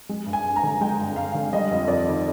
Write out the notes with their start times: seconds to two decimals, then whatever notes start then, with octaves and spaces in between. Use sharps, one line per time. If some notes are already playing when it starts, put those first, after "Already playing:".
0.09 G#3
0.26 G2
0.33 G#5
0.44 G2
0.56 A#5
0.63 D3
0.81 G#3 G5
0.99 G2
1.16 G2 F5
1.34 D3
1.53 G3 D#5
1.71 F2
1.88 F2 D5
2.06 D#3